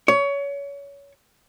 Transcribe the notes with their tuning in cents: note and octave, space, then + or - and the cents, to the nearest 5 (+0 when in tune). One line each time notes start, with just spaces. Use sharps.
C#5 +25